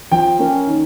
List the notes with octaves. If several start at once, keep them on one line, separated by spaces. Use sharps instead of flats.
F3 G5
A#3 C#4
D#3